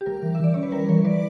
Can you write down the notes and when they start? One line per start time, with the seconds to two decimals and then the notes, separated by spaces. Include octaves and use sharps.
0.01 G4
0.06 G3 A#4
0.23 E3
0.35 E5
0.39 E3 D5
0.54 C#4 C#5
0.63 B4
0.72 G3 A#4
0.89 E3 A#4 C#5
1.05 E3 B4 D5